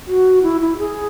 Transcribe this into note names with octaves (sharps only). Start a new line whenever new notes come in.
F#4
E4
E4
G#4